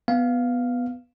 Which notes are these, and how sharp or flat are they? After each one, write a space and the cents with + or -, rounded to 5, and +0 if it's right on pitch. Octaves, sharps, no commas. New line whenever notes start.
B3 +0 F5 +0